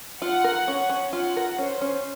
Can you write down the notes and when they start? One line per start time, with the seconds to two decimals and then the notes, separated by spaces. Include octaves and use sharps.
0.21 F4 F#5
0.44 A#4
0.68 C#4
0.90 C#4
1.13 F4 F#5
1.37 A#4
1.58 C#4 C5
1.81 C#4